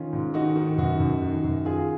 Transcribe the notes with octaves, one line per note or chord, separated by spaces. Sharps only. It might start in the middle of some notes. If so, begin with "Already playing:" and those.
Already playing: D#3 C#4 F4
G#2
D#3 D#4 F#4
D#3
F#2 D#4 F#4
F#2
D#3
F#2
D#3 F4 G#4